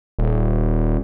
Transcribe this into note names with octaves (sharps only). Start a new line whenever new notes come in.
D#1